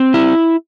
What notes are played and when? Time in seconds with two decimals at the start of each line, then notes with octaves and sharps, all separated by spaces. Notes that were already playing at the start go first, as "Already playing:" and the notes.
Already playing: C4
0.14 E4